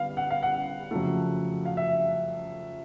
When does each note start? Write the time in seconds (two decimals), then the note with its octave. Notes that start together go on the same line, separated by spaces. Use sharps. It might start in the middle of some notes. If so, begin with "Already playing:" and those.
Already playing: D3 G3 B3 F5
0.17 F#5
0.30 F5
0.43 F#5
0.91 F2 C#3 F#3 A3
1.65 F5
1.77 E5